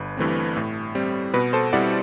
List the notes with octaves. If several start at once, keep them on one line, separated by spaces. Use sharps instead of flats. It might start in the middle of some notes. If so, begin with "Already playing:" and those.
Already playing: G1 B4
G2 E3 A3 C4
A2
G3 C4
B2 B4
A4 C5
G3 C4 E4 D5 F#5